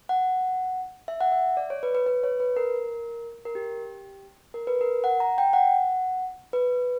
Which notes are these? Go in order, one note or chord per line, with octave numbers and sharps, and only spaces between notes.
F#5
E5
F#5
E5
D5
C#5
B4
C#5
B4
B4
C#5
B4
A#4
A#4
G4
A#4
B4
A#4
F#5
A#5
G5
F#5
B4